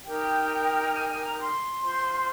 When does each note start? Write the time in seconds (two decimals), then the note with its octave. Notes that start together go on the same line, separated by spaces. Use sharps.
0.04 D#4 G4 A#4 G5
0.94 G#5
1.08 G#5
1.23 A#5
1.38 C6
1.82 F4 C5